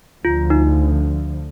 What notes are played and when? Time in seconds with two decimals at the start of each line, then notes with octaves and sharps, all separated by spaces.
0.25 D2 D3 F3 F4
0.50 D#4